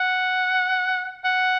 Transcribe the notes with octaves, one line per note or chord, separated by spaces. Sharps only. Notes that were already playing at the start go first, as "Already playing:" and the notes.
Already playing: F#5
F#5